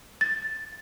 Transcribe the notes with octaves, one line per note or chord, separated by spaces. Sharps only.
A6